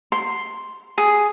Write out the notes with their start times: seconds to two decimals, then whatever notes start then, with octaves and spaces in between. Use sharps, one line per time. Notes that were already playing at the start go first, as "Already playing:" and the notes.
0.12 C6
0.98 G#4